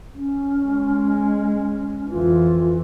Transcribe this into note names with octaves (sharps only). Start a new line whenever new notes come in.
C#4
G#3
F2 E3 F4